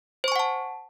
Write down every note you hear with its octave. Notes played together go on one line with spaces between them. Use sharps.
C5 F#5 G#5 A5 C#6